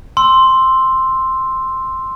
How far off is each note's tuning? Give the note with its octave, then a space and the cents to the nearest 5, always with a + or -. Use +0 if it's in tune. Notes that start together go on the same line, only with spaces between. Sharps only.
C6 +0 E6 +0